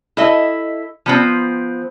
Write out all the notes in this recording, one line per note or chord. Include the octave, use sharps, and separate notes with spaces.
E4 A4 D#5 E5
F3 B3 C4